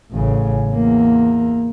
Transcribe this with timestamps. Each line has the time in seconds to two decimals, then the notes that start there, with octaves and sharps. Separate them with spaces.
0.11 A1 C#3
0.69 E2 A#3